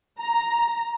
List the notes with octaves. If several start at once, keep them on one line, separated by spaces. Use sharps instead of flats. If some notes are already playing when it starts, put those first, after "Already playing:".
A#5